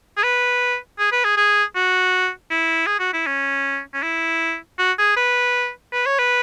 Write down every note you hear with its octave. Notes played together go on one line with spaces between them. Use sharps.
G#4
B4
G#4
B4
G#4
G#4
F#4
E4
G#4
F#4
E4
C#4
C#4
E4
F#4
G#4
B4
B4
C#5
B4